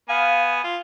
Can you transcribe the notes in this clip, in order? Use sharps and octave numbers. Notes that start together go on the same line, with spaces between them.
B3 F5 G#5
F4